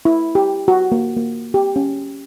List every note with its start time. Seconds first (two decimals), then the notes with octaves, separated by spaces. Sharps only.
0.05 E4
0.35 G4
0.68 F#4
0.92 A#3
1.16 A#3
1.54 G4
1.76 C#4